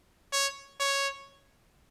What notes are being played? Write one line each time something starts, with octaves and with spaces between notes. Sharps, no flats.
C#5
C#5